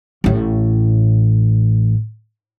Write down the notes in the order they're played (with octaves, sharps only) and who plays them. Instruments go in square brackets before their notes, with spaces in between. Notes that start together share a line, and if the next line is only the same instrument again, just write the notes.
[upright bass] A1 A2